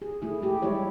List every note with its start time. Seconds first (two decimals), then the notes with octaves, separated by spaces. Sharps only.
0.02 G#4
0.22 A3 E4 G#4
0.42 A3 G4
0.62 G3 G#3 E4 C#5 D5